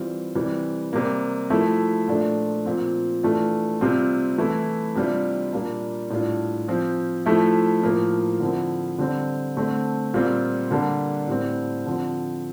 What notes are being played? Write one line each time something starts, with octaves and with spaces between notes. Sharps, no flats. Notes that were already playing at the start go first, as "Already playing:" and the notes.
Already playing: E3 G3 C4 F4
C3 E3 G3
C3 G3 A#3
F3 A3 E4
A#2 F3 A3 D4
A#2 F3 C4
E3 A3 D4 F4
C3 G3 C4 F4
E3 A3 E4
C3 G3 D4 F4
A#2 G3 A#3 D4
A2 G3 D4 F4
F3 C4 F4
F3 A3 E4
A2 F3 A#3 F4
D3 F3 C4 E4
D3 G3 C4
D3 A3 C4
A#2 G3 C4 F4
D3 G3 A#3 D4
A2 G3 C4
D3 F3 C4